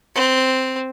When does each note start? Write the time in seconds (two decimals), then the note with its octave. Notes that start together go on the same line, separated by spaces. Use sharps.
0.15 C4